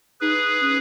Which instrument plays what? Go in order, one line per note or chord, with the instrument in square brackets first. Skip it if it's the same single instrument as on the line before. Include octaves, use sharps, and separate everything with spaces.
[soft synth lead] D#4 [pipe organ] G#4 B4
[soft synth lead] C#4